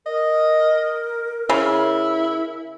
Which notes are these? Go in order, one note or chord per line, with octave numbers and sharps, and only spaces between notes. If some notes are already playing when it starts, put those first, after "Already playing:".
A#4 D#5
C#3 E4